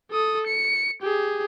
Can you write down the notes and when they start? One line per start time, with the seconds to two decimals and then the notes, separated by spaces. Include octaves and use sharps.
0.11 A4 D#6
0.46 C#7
1.02 G4 G#4